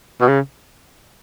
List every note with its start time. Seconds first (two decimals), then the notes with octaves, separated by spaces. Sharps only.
0.21 B2
0.28 C#3